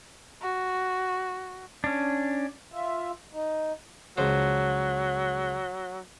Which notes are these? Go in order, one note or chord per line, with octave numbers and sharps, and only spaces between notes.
F#4
C#4 D4
F4 E5
D#4
C#2 F3 F#3 C5